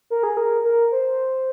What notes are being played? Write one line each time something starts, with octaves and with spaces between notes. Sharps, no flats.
A#4
G#4
A#4
A#4
C5